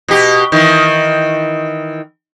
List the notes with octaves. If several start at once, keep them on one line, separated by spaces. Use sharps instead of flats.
B2 G4
D#3 E3